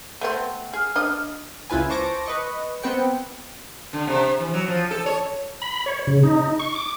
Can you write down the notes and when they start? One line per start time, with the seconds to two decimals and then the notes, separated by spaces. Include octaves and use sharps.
0.21 A3 B3 C4
0.73 G#4 F6
0.96 D4 D#5
1.70 C#2 E4 F4 B4 G#5
1.90 C5 A5 C#6 D6 A#6 D7
2.26 B4 D#5 C#6
2.83 B3 C4 B4 G5 C#7
3.93 D3
4.07 C3
4.40 E3
4.54 F#3
4.68 F3
4.91 A4
5.06 C#5
5.62 B5
5.86 C#5
6.07 C#3
6.23 D#4
6.59 C#6
6.75 D6